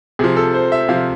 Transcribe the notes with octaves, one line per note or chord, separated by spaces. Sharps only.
C3 F3 G#4
A4
C5
E5
C3 F3 F5